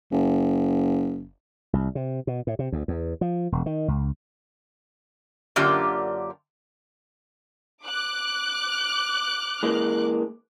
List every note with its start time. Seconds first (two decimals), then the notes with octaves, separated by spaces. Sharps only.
0.12 F#1
1.73 C2
1.95 C3
2.27 B2
2.47 A2
2.59 C3
2.72 D2
2.88 E2
3.21 F3
3.52 E1
3.66 D#3
3.88 C#2
5.56 F#2 D3 A#3 F4 G4 D5
7.85 D6 F#6
9.63 E3 G#3 A#3